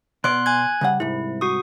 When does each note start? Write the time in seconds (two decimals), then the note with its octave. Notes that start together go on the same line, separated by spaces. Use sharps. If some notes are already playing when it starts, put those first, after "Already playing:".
0.24 B2 B3 D5 C6 F#6
0.46 G#5 F#6 G#6
0.81 C#3 G3 F#5
1.00 C2 G#2 E4
1.41 F#4 C#6 D#6